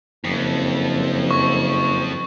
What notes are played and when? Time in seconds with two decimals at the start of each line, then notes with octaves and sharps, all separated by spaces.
0.24 F#1 F2
1.31 C#6